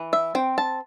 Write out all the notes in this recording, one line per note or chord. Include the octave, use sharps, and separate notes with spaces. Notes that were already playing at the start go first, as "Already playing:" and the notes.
Already playing: E3
E5
C4 G5
A5